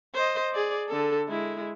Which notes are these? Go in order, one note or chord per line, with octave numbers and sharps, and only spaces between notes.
C5 D#5
G#4 D5
D3 A4
G#3 E4